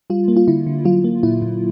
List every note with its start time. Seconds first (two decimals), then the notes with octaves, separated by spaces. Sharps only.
0.10 G3 F4
0.28 A#3
0.37 F4
0.48 D3 E4
0.67 D3
0.85 F#3 F4
1.04 A#3
1.23 A#2 E4
1.42 A#2